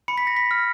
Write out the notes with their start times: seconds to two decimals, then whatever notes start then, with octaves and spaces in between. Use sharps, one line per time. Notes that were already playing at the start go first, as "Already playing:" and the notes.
0.08 B5 C#7
0.18 B6
0.27 A#6
0.37 B6
0.51 F6